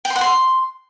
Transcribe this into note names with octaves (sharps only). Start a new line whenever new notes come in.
G5
C6
F#5
C6